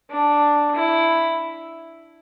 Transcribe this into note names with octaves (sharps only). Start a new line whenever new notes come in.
D4
E4